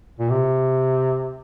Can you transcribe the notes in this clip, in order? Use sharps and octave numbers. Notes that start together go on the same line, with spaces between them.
A#2
C3